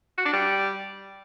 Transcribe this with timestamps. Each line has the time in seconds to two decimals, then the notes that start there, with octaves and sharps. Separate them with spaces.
0.18 F#4
0.25 D4
0.33 G3